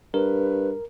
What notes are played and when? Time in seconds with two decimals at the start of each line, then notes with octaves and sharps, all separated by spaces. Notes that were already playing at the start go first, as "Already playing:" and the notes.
0.14 G2 A#4 B4